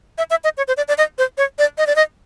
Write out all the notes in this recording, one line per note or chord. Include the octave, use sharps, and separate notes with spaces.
E5
E5
D#5
C#5
C5
D5
D5
D#5
C5
C#5
D5
D#5
D5
D#5